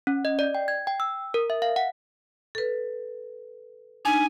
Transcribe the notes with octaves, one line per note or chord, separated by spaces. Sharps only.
C#4
D#5
D5
G5
G#6
G5
E6
A#4
E5
F5
F#5
A4 B4
D4 D#4 G#5